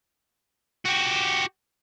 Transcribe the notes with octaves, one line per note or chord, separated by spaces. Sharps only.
F#4 G4